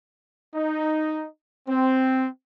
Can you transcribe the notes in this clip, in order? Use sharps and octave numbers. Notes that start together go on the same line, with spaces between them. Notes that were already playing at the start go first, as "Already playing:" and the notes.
D#4
C4